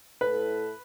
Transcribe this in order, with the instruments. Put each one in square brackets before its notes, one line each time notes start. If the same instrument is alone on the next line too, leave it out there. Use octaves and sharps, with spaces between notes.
[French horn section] A2 E4 A4 [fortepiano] B4